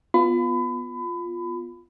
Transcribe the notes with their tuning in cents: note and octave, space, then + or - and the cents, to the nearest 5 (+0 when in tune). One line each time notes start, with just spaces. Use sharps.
B3 +0 F4 +0 B5 +30